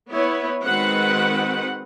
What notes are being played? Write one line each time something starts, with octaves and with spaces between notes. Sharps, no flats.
B3 E4 C#5
D#3 G#3 C4 F#4 B4 F#5